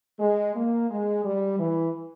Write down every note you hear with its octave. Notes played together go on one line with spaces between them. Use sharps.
G#3
A#3
G#3
G3
E3